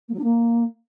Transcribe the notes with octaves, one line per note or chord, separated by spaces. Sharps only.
A#3
F#3
D4
A#3